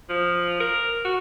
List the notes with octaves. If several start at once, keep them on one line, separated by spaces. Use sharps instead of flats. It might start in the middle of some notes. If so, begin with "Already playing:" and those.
F3
A#4
F#4